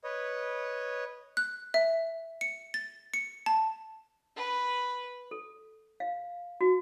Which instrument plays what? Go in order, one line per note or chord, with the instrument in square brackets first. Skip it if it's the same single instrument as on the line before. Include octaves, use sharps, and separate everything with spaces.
[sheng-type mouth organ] B4 C#5 D#5
[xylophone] F#6
E5
C#7
A6
C#7
A5
[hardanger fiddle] B4
[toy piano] A4
F5
F#4